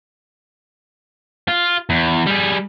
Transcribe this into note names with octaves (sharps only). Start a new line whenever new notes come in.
F4
E2
G3 G#4